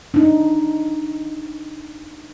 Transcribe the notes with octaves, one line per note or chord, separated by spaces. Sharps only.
D4 D#4